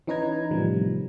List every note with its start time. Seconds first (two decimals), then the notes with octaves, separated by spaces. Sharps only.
0.07 E3 C#4 D#4 B4 A#5 G#6
0.51 A2 C3 D#3 F3 G3